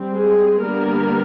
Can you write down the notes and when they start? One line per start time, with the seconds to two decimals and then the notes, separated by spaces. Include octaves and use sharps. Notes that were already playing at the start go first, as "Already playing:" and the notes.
Already playing: G3 C4
0.15 G#3 G#4
0.61 D3 G3 A#3 B3 A#4